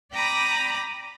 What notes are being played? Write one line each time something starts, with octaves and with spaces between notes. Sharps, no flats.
D5 G5 A#5 B5 D6 D#6